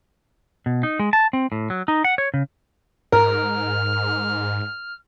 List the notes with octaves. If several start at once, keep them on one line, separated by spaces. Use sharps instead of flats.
B2
D#4
G#3
A5
C4
A2
F#3
D#4
F#5
C#5
C#3
G#2 A#4 F6